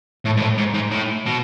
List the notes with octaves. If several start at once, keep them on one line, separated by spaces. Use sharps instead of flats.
A2
G#2
A2
G#2
G#2
A2
B2